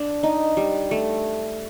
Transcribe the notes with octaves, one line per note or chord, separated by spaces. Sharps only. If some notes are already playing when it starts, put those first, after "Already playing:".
Already playing: D4
D#4
G3
A3